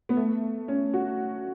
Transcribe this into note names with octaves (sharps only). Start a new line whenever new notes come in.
B3
A3
C#4
F#4